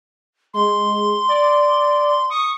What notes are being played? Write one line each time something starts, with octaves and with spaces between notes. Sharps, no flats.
G#3 C6
D5
C#6 D#6